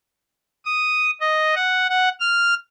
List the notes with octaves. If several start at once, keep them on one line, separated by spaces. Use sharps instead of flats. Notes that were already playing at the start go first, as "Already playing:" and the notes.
D#6
D#5
F#5
F#5
F6